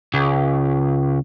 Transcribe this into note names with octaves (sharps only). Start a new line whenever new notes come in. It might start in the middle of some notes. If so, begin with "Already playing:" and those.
C#2